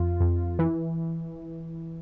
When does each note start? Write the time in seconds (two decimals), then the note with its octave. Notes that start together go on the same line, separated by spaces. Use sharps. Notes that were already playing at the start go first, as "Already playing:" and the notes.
Already playing: F2 F4
0.20 F2
0.59 E3